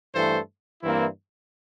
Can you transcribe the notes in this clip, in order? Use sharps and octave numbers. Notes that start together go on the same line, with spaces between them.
G2 E3 A3 A4 C5
G2 E3 A#3 C4 E4